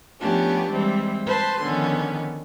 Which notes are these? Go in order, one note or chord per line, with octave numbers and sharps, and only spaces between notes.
F3 A3 B3 C#4 D4 G4
E3 G3 G#3 C4
B4 C5 A5 C6
D3 D#3 F3 B3 C#4